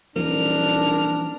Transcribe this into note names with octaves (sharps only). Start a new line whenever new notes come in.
D#1 E3 F3 D4 A#4